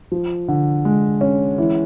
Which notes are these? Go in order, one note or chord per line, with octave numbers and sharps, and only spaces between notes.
F3
D3
G#3
C#4
E3